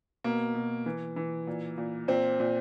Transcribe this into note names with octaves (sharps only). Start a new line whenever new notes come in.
B2 A#3
B2
E3
E3
A#2
A#2
A#2 C4
A#2